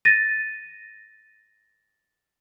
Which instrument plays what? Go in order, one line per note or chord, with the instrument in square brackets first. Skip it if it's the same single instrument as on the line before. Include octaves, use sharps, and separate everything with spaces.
[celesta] A6 A#6 D#7